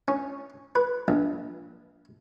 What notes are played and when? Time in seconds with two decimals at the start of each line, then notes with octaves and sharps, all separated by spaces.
0.08 C#4
0.75 B4
1.08 A#1